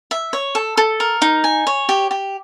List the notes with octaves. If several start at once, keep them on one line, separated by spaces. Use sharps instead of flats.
E5
C#5
A4
A4
A#4
D#4
G#5
C#5
G4
G4